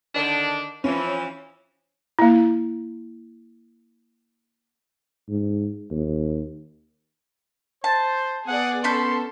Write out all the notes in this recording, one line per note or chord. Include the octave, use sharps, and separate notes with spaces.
D3 D#3 D4
E3 F3 C#4
A#3 E4
G#2
D#2
C5 A5
B3 G#4 D5 F#5
C#4 A4 B5 C6 G6